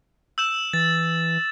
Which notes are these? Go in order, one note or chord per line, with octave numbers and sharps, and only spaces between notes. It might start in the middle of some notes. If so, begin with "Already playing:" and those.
E6 G6 E7
E3 A6